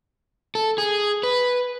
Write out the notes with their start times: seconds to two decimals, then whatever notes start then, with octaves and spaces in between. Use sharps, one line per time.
0.55 A4
0.78 G#4
1.23 B4